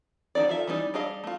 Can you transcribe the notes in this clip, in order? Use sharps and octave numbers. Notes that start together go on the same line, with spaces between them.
D#3 F3 C#4 D#4 D5
D#3 F4 A4 E5
E3 G3 D4 D#4 D5
G3 D4 G#4 D#5 F5
A3 F4